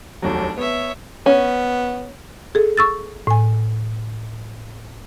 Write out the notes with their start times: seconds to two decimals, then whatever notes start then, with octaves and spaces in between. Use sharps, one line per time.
0.22 F1 D#2 F#3 D4
0.58 B3 C#5 E5
1.26 B3 C#4
2.55 G#4 A4
2.77 C#6 E6 A6
3.27 A2 G#5